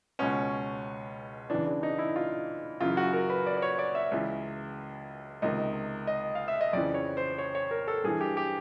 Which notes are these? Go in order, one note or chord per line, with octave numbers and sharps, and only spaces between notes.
C#2 B2 C#4
E2 C#3 E3 D4
D4
D#4
E4
F4
F#2 C#3 E3 F4
F#4
A#4
B4
D5
D5
C#5
D5
E5
C#2 C#3 E3
C#2 C3 D#3 D#5
D#5
F5
E5
D#5
F2 C#3 E3 D5
C#5
C5
C#5
C#5
A#4
A4
G2 E3 G#4
G4
G4